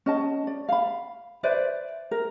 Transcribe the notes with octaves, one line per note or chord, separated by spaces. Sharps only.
C#4 D#5 A5
D5
F5 B5
B4 C5 D5 E5
A#4